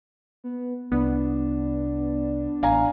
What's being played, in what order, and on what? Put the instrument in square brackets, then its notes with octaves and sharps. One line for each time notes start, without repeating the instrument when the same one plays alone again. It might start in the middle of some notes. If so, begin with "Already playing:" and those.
[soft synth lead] B3
[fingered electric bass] C2 [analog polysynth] B3 [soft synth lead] D4
[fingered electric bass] A1 [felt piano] F5 G#5 A#5